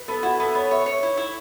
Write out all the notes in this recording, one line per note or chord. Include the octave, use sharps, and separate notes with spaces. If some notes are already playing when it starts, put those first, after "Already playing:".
Already playing: B4
B3 A4
E4 F#4
B3 A4
B3 C#5
C#5 E5
C#5
E4
E4